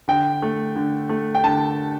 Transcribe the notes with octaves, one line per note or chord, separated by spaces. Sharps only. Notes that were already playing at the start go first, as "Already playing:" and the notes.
D3 G5
A3
D3
A3
G5
D3 A5